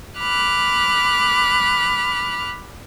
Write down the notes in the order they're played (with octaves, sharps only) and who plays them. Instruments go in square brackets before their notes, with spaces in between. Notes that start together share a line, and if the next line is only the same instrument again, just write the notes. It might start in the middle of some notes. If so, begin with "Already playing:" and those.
[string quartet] B5 D6 F6 F#6